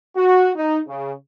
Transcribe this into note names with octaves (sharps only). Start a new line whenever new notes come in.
F#4
D#4
C#3